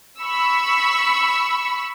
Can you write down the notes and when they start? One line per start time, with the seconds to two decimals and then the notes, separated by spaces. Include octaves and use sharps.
0.20 B5 C#6 E6